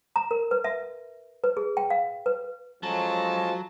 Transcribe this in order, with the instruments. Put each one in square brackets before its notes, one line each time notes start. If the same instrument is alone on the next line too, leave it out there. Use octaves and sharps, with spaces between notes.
[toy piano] A#5
A#4
B4
E5
B4
G#4
G5
F5
B4
[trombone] F3 [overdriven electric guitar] F#3 [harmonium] G#3 C#4 A4 [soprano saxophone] A5